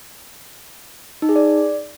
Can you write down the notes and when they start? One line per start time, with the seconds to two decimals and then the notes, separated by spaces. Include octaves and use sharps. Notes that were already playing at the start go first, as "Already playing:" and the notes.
1.22 D#4
1.29 G#4
1.36 D5